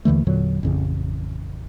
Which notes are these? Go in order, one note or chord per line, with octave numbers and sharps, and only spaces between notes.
D#2 D3 E3 A3
E2 A#2 D3 F#3
A1 F2 C#3